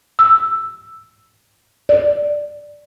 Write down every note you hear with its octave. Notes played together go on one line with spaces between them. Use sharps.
E6
D5